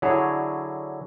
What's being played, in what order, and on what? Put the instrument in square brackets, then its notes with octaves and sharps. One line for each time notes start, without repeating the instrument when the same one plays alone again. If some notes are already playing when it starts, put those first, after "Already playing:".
[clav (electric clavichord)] D3 F#3 E4 G#4 C#5